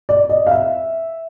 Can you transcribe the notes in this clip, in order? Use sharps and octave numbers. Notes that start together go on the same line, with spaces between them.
D5
D#5
F5
E5